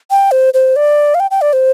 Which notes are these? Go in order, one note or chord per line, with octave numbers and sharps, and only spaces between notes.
G5
C5
C5
D5
F5
G5
G5
D5
C5